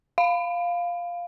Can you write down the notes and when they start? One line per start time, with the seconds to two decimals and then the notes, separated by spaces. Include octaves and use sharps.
0.18 F5